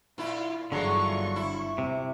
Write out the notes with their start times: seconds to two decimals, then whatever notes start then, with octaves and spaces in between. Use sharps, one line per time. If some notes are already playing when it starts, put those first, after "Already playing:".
0.18 A#2 E4 F4
0.72 G1 D3 E3 F#3 G#3 F4 C#6
1.36 E4
1.78 C3